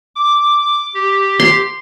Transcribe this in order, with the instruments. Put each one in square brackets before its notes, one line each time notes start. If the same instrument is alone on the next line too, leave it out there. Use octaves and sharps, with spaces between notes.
[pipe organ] D6
G4
[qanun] C6